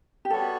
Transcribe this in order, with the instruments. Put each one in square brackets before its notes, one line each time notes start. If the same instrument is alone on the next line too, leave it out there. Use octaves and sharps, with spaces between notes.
[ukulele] G4
[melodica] G3 B3 F#4 C#5 [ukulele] A4